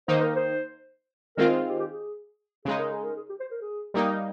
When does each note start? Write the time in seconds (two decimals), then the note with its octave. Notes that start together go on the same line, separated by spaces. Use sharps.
0.08 D#3 A#3 D#4 C5
0.21 A#4
0.36 C5
1.37 D#3 G#3 C4 F4 A#4
1.69 G4
1.79 G4
1.90 G#4
2.65 C#3 G#3 D#4 G#4
2.78 A#4
2.91 G#4
3.03 A#4
3.16 G#4
3.29 G4
3.40 C5
3.51 A#4
3.61 G#4
3.94 G3 A#3 D#4